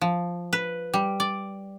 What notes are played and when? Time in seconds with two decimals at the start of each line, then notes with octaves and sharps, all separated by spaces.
0.01 F3
0.53 B4
0.94 G3
1.20 D5